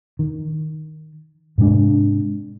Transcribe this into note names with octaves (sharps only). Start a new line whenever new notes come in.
D#3
G#2 C3 G#3 D4